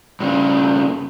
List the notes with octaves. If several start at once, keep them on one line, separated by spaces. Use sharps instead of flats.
G2 C#3